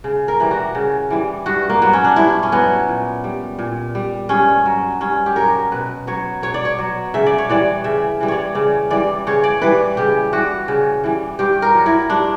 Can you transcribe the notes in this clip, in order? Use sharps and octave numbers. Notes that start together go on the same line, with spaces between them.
C#3
A#4
E3 G3
F#4
C#3
E3 G3
G2 F#4
A#3
F#3 B3
C#4
D4
G2 E4
C#4
F#3 B3
A#2
G3
A#2
G3
G2 C#4
F#3
G2 C#4
G4
F#3 A#4
B2 B4
F#3 C#5
B2 C#5
D5
C#5
F#3
C#3 E5
D5
C#5
E3 G3 D5
C#3 E5
E3 G3
C#5 D5
C#3 D5
E3 G3 D5
C#3 C#5
D5
E3 G3 B4
C#3 G4
E3 G3 F#4
C#3
E3 G3
G2 G4
A#4
F#3
E4
G2 D4